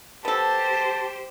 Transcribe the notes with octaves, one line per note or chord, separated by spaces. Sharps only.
B3 G4 A4 C5 A5